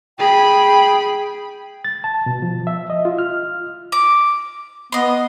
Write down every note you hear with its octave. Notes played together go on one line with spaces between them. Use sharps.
G#4 G5 B5
A6
A5
B2
F3
E5
D#5
F4
F6
D6
B3 D#5 C6